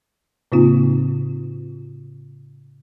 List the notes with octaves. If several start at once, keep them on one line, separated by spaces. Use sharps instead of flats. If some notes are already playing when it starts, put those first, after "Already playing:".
A2 C#3 A#3 C4 D#4 F4